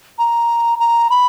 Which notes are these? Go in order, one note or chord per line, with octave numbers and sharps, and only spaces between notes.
A#5
A#5
B5